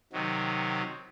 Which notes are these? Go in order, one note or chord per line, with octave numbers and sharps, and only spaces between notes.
C3 D#3 F#3